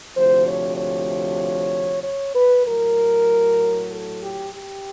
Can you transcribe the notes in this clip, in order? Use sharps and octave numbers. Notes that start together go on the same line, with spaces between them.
D2 C3 F3 C5
C#5
C#5
C#5
B4
A2 F#3 A#4
A4
G4
G4